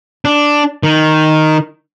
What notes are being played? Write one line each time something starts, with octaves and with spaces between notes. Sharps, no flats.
D4
D#3